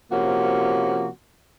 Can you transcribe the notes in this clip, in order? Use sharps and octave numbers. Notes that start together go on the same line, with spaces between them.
C3 F3 A#3 C#4 F#4